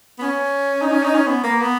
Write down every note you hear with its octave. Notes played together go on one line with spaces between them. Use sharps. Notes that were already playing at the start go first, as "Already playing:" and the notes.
B3
C#4
D#4
C#4
D#4
C#4
B3
A#3
B3